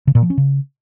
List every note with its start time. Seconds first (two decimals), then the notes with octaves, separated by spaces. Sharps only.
0.07 C#3
0.15 A#2
0.22 F3
0.30 C#4
0.38 C#3